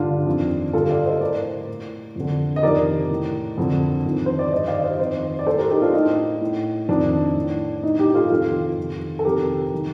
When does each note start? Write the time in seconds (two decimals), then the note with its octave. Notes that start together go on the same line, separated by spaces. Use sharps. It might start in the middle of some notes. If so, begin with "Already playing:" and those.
Already playing: G2 D3 D4 F4
0.26 F2 D#3
0.73 G2 D3 F4 A4
0.89 D5 F5
1.05 C5 D#5
1.21 A2 A#4 D5
1.68 A2
2.16 F2 D3
2.56 D#5
2.63 F2 C3 D#3 A#4 D5
3.10 A2
3.58 F2 D3
4.05 F2 D#3
4.26 C5
4.39 D5
4.52 G2 D#3 C5 D#5
4.67 D5 F5
4.83 C5 D#5
4.99 F2 D#3 C5 D#5
5.39 D5
5.46 A2 A4 C5
5.58 G4 A#4
5.70 D#4 G4
5.82 D4 F4
5.94 A2 D#4
6.41 A2
6.89 F2 D#3 D4
7.36 A2
7.83 A2 D#4
7.98 D#4 G4
8.09 G4
8.14 F4 A4
8.30 F2 C3 D#3 F4 A4
8.77 F2 D#3
9.19 A4
9.25 F2 C3 D#3 G4 A#4
9.74 D#3